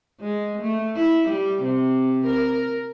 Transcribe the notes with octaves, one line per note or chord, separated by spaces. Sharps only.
G#3
A3
E4
G3
C3
A#4